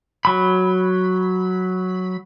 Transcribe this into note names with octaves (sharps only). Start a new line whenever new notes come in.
F#3 B5